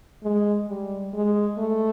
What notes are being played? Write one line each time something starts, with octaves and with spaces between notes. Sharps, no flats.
G#3
G3
G#3
A3